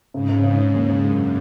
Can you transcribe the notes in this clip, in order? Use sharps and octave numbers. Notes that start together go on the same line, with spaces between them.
G#2 C#3
C#3
C#3
C#3
D#2
C#3
F#2 G#3